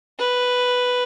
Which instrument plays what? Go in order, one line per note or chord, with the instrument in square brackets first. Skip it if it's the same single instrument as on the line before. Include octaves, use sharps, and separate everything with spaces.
[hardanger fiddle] B4